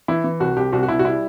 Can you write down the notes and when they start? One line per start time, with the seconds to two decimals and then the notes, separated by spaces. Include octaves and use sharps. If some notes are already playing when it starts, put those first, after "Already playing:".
0.08 E3 E4
0.24 E3
0.40 C2 F#4
0.57 C2 G4
0.73 C2 F#4
0.83 F#4
0.88 C2 E4
0.99 F#4
1.05 G3 E4